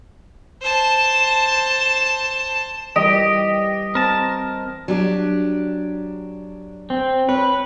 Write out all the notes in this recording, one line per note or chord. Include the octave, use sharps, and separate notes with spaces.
C5 A5
E3 G3 G4 D#5
C4 A#4 A5
F#3 D4 G4
C4
B4 C#5